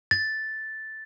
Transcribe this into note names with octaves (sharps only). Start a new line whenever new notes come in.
A6